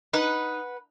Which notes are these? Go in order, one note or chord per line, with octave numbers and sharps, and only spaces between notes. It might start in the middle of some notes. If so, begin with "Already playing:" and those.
D#4 B4 F#5